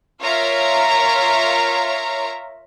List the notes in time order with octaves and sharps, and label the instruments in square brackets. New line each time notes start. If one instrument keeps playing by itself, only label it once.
[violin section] F4 A#4 C#5 E5 F5 A#5